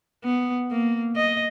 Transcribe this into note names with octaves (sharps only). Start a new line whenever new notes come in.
B3
A#3
D#5